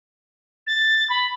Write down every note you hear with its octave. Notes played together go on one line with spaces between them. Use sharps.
A6
B5